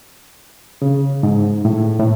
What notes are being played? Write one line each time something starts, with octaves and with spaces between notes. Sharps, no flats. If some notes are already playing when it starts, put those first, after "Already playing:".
C#3
G#2
A2
A2